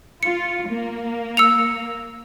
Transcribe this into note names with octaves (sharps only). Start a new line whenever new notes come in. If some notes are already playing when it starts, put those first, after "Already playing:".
F4 C#7
A#3
E6 C#7 F7